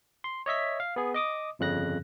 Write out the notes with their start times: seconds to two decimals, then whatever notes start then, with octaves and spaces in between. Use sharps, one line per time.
0.24 C6
0.46 C#5 D#5 E5 B6
0.80 F5
0.96 B3 G#4
1.14 D#5 D6 D#6
1.59 G1 F2 C#3 F#6 A#6